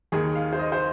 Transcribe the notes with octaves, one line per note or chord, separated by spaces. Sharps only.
D#2 D#3 G#4
F5
C5
D#5
C5